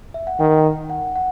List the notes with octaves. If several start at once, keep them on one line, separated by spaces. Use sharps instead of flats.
E5
F#5
D#3 G5
F#5
F#5